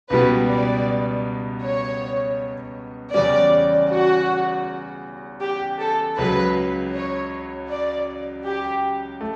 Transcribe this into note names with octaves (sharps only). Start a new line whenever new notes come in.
C#2 B2 G3 B3 B4
D5
C#5
E2 C#3 G3 C#4 D5
F#4
G4
A4
C#2 C#3 F#3 B4
C#5
D5
G4
A3